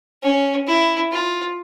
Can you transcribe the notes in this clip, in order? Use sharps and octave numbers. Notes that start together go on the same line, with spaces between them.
C#4
E4
F4